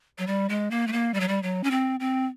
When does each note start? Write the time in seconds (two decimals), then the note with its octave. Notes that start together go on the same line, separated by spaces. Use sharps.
0.18 F#3
0.27 G3
0.49 G#3
0.71 A#3
0.87 A3
0.92 A#3
1.14 G3
1.20 F#3
1.28 G3
1.43 F#3
1.64 C#4
1.71 C4
2.00 C4